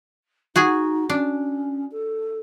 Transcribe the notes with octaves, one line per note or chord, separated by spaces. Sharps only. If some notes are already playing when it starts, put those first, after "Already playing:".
D#4 F#4 G#4 G#5
C#4 D4
A4